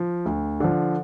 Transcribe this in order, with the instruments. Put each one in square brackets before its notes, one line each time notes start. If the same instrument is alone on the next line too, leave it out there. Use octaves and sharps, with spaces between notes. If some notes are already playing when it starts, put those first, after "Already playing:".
Already playing: [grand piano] F3
D2
D3 F3